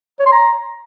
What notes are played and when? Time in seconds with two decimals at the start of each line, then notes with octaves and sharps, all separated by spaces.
0.20 C#5
0.26 C6
0.32 A#5